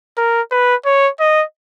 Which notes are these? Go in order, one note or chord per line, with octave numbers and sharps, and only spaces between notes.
A#4
B4
C#5
D#5